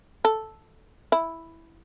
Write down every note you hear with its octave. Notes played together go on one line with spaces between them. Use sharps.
A4
E4